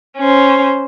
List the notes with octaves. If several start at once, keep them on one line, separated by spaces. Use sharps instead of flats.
C#4 C5